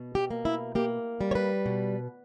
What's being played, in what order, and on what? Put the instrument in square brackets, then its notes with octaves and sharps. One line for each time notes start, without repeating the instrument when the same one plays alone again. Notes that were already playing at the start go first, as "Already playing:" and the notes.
Already playing: [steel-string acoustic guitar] B2
G4
A#3
E4
A#3 G4
G3
C#5
B4
B2